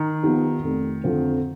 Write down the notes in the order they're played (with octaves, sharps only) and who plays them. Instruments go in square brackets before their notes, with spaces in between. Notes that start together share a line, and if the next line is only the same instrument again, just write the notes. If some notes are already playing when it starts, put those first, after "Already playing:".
Already playing: [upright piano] D#3
[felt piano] F3 B3 D#4 G4
F1
F2 D3 F3 C4